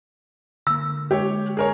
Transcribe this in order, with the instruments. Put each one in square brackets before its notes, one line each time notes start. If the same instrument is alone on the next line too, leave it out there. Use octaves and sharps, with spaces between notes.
[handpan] D3 A#3 [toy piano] E6
[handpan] G#3 [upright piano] G4 C#5
[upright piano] G#4 A#4 C#5